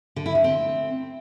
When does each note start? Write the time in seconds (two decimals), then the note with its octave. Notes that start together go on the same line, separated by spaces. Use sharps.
0.16 D3
0.26 E4
0.35 D3
0.44 C4